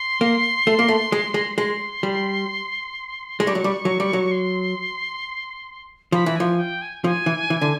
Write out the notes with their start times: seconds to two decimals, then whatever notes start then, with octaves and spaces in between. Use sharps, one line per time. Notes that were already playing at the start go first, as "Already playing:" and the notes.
Already playing: C6
0.21 A#3
0.67 A3
0.79 A#3
0.88 A3
1.12 G#3
1.34 G#3
1.58 G#3 C6
2.03 G3
3.40 G#3 C#6
3.47 G3
3.55 F#3
3.64 G3
3.85 F#3
4.00 G3
4.13 F#3
4.31 C6
6.12 F3 B5
6.26 E3
6.36 F3 G#5
6.59 G5
6.82 G#5
7.04 F3 G#5
7.26 E3
7.50 E3
7.62 D3